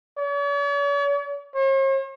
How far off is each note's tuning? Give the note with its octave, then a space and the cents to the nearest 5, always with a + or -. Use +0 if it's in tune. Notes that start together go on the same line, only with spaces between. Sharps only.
C#5 +45
C#5 -45